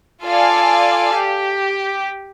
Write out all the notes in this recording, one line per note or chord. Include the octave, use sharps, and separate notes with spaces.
F4 A4 D5 F5 G#5
G4